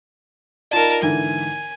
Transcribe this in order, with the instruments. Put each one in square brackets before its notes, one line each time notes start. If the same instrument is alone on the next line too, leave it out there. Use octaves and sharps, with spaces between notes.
[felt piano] D#4 F4 D5 [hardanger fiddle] A#4 A5
[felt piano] G#2 D3 E3 [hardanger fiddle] G#5